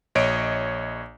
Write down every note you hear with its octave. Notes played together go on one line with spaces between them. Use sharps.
A#1 C#5 D#5 D7